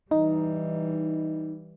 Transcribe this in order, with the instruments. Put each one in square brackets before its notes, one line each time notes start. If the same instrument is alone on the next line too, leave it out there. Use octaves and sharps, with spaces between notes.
[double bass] E3 G3 [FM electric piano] D#4